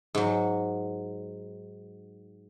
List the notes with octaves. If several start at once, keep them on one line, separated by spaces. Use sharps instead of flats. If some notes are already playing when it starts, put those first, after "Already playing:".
G#2 F#3